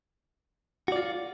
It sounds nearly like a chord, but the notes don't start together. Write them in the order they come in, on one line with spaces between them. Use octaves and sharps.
F#4 D5 F4